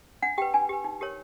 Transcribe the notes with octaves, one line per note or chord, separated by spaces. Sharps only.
D4 F#5
G4 B4 G5
D4 G#5
G4 B4
D#4
G4 A#4 C#5